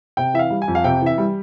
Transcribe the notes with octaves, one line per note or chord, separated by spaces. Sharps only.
C3 G5
E3 E5
F5
G3
G#5
F2
F5
C3 G5
E3 E5
G3